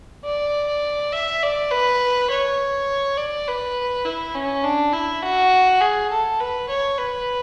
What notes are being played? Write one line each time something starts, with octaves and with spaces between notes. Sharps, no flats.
D5
E5
D5
B4
C#5
D5
B4
E4
C#4
D4
E4
F#4
G#4
A4
B4
C#5
B4